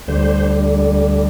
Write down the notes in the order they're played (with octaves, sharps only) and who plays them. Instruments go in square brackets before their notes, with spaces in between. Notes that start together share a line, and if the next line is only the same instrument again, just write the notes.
[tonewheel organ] D2 D3 G3 C5